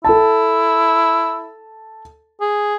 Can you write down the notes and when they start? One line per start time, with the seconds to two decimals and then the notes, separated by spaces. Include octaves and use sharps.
0.05 E4 A4 A5
2.41 G#4